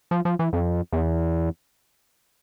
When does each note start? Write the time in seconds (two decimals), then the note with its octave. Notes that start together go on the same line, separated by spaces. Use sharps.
0.11 F3
0.25 F3
0.39 E3
0.53 F2
0.92 E2